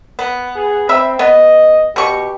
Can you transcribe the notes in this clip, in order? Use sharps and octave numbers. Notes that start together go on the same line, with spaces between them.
B3
G#4
C4 E5 B5
B3 D#5
B2 G4 C#6